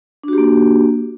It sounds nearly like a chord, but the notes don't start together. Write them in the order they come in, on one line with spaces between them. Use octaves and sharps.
D4 F#4 G4 A#3